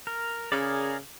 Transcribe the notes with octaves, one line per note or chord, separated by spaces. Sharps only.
A#4
C#3 G#4 A#4 D5